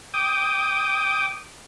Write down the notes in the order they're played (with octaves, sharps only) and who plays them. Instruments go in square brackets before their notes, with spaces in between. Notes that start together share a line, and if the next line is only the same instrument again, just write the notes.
[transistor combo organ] G5 D6 D#6